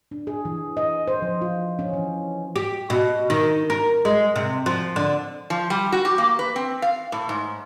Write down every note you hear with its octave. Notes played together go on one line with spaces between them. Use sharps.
D4
G#4
E3
D#5
C5
F3
F4
C#4
E3
G4
B2
D#3
A#4
G#3
C3
F3
D3
F3
G3
F#4
G4
A#3
B4
C4
F5
A2
G#2